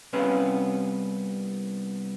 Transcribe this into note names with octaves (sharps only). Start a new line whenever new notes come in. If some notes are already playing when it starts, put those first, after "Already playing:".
C2 C3 B3 C#4 B4 F5